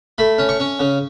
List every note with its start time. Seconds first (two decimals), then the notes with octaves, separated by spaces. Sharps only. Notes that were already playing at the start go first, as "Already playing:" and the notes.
0.18 A3 B5
0.38 C#4
0.49 C#6
0.60 C#4
0.80 C#3